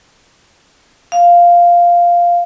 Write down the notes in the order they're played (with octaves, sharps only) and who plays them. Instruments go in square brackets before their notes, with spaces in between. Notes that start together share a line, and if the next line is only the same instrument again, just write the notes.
[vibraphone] F5